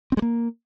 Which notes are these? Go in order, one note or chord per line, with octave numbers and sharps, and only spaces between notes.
C4
G#3
A#3